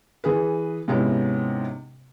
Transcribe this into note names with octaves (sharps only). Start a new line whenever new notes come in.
E3 G#4 B4
G#2 C3 B3 C#4 E4